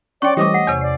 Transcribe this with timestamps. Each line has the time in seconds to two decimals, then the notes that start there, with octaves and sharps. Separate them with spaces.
0.22 C#4 C#5 D5 G5 C6 C#6
0.37 E3 G3 A3 G4 C5 D#5 D6
0.54 F#5
0.67 E2 C3 C#5
0.81 D5 C7